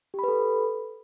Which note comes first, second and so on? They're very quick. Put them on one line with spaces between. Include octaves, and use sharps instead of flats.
G4 B5 B4 A4